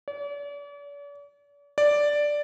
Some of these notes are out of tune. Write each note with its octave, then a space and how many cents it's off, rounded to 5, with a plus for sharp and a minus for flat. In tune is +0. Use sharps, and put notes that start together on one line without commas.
D5 -45
D5 +0